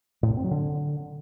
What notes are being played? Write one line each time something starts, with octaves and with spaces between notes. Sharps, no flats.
A2
C3
C4
F#3
D3